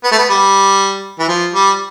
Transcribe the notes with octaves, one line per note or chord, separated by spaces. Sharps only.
B3
A3
B3
G3
E3
F3
G3